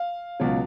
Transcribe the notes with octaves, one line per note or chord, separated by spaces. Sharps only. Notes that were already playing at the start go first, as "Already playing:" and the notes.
Already playing: F5
C#2 B2 F#3